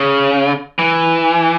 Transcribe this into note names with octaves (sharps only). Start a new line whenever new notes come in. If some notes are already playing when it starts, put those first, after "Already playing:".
Already playing: C#3
E3